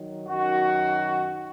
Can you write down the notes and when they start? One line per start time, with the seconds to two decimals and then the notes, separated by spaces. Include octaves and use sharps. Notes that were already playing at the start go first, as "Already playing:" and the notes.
Already playing: D#3 F#3
0.27 F#2 D#3 F#3 F#4